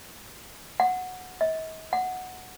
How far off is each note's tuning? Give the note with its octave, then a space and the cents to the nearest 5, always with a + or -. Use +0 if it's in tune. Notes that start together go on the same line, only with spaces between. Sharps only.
F#5 -10
D#5 +45
F#5 -5